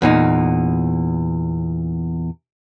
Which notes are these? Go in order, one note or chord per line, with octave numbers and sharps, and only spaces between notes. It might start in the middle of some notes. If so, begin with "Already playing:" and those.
E2 A#2 D#4